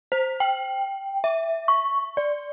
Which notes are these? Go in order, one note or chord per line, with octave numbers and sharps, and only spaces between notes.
C5
G5
E5
C#6
D5